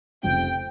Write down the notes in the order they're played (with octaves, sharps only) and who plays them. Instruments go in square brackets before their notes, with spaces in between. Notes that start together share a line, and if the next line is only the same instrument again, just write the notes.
[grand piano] F1 F2 C#3 [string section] G5